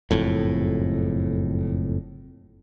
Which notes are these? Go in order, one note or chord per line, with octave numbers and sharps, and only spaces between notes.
F#1 F2 A2